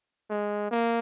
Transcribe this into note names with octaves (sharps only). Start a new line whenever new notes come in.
G#3
A#3